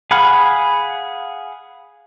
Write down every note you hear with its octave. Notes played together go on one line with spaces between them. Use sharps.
G#4 F5 F#5 B5 F6